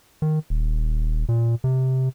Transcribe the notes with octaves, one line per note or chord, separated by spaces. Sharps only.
D#3
D#1
A#2
C3